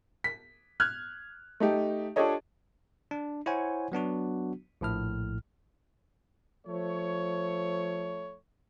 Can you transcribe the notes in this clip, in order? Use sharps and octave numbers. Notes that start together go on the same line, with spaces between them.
B6
F6 F#6 G#6
A3 D#4 G4
D4 F4 G4 A4 C#5 D#5
D4
E4 C5 C#5 F#5 G#5
F#3 B3 D4 F#4
A#1 A2 F6
F3 A3 C#5